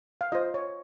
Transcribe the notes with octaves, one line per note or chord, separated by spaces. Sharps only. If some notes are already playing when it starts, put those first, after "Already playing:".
F5
F4 C5 D#5
C#5